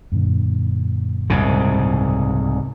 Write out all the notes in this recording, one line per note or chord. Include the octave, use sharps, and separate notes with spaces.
F#2 A#2 D3
C2 G#2 C#3